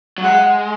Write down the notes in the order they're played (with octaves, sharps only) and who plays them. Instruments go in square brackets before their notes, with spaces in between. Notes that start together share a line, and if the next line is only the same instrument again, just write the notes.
[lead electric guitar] F#3
[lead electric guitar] G#3 [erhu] F#5